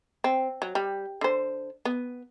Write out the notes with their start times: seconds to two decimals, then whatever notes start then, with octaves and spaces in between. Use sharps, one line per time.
0.24 C4
0.62 F#3
0.75 G3
1.21 D3 C5
1.85 B3